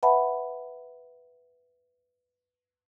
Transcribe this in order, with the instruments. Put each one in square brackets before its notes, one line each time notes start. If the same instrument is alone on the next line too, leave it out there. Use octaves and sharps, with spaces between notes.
[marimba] B4 E5 F#5 A5 B5